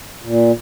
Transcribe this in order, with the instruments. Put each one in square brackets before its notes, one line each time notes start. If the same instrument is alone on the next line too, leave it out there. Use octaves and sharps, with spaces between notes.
[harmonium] A#2